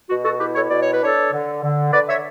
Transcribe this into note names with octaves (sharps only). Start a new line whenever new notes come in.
B2 F#4
F#4 A4
E4 G4 B4
A4 C#5
B2 D5
C#5
B4
D4 A4 C#5
D3
D3
D3 B4 D5
C#5 E5